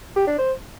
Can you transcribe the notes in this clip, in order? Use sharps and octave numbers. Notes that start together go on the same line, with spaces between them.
G4
D4
C5